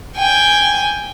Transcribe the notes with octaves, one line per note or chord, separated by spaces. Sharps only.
G5 G#5